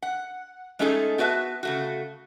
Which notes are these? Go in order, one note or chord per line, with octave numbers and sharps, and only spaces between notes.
F#5
G#3 A3 C#4 D#4 G#4 A4
B3 F#4 B4 E5 A5
C#3 A3 F#4